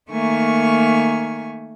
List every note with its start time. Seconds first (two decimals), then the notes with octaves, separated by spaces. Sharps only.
0.10 D#3 A3 A#3 G#5 C#6